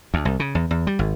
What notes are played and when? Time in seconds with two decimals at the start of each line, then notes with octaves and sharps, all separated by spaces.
0.14 D2
0.25 C2
0.40 C#3
0.55 E2
0.71 E2
0.87 G3
0.99 G#1